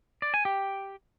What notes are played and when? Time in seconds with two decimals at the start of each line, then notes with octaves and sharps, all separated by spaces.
0.22 D5
0.34 G#5
0.45 G4